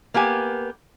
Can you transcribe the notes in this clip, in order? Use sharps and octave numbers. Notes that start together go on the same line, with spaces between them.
A#3 B3 G4 G#5